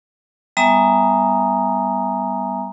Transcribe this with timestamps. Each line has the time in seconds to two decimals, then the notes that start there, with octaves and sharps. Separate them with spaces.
0.57 G3 B3 E5 G#5 A#5 D#6